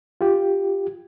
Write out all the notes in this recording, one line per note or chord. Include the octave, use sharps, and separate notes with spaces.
F4 G4